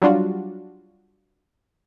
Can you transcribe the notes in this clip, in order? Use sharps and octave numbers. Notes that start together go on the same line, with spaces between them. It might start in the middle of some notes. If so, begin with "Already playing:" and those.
F#3 G3 D4 F4 F#4